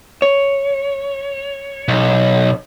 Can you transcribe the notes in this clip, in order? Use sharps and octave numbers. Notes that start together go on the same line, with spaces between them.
C#5
B1